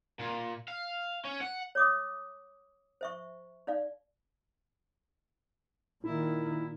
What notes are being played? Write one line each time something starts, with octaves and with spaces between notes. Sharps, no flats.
A#2
F5
C#4
F#5
C#5 D6 D#6
C5 E5 C#6
D#4 D5 F5
A#2 D#3 E4